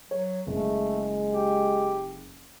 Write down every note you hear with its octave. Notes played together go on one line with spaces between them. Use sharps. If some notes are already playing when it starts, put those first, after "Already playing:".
F#3 C#5
F#1 G#3 A3
G4